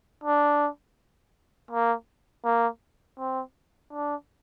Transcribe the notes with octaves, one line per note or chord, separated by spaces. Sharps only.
D4
A#3
A#3
C4
D4